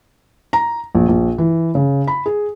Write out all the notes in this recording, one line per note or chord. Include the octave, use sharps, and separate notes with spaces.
A#5
A#1
A#1
E3
C#3
B5
G#4